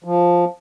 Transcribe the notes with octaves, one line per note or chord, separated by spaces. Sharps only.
F3